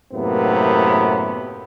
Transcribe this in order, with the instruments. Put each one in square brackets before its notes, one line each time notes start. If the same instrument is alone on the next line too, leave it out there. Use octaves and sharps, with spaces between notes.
[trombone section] F#2 A2 C3 A#3 B3